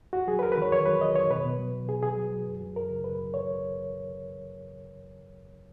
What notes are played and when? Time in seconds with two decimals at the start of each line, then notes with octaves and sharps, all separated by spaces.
0.13 F2 F#4
0.27 F#3 G#4
0.39 B4
0.43 F2 A#4
0.52 B4
0.57 D#3 C#5
0.71 F2 C#5
0.86 F#3 B4
1.01 F2 D#5
1.16 D#3 C#5
1.31 B2 B4
1.45 B2
1.59 F#3
1.74 F#3
1.88 B2 G#4
2.03 B2 G#4
2.17 F#3
2.32 F#3
2.46 F#2
2.61 F#3
2.76 F#2 A#4
2.90 C#3
3.04 F#2 B4
3.19 F#3
3.34 C#5